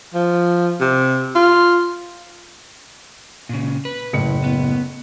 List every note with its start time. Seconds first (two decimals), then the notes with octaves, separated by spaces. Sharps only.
0.14 F3
0.81 C3
1.36 F4
3.49 A#2 C#3
3.85 B4
4.13 F#1 A2 C#7
4.44 B3